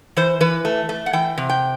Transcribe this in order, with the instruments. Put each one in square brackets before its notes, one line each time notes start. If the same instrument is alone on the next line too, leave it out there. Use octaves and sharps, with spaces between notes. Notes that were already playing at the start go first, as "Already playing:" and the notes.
[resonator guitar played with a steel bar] E3 C5
E3 B4
A3
A3
F#5
E3 G5
C3
G5